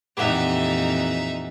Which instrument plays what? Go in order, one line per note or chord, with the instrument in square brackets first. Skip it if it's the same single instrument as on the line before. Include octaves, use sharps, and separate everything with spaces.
[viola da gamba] F2 A#2 E3 [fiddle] D#4 E5 [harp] G4 F#5